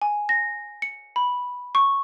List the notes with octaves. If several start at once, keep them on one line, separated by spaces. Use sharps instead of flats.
G#5
A#6
C#7
B5
C#6